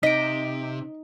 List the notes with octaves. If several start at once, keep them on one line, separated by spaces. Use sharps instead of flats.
C3 D#4 D#5 B6 D7